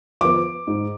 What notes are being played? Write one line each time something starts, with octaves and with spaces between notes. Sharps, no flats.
F3 B3 D6
G#2